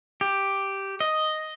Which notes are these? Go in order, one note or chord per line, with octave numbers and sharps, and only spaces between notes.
G4
D#5